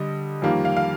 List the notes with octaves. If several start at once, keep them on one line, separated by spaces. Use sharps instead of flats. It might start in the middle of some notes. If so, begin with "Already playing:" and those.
Already playing: D3 G3 D#5
F2 D#3 G3 A#3
F5
F5